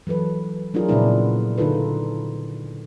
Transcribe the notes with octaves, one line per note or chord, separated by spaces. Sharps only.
E3 F#3 A4 B4
F#3 D4 E4 F4 G#4 A#4
A#2 C#3 F3 B3 D4 E4
D3 D#4 F4 A4 B4